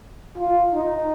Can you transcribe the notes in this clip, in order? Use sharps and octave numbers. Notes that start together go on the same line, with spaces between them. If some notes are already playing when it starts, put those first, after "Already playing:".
F4
D#4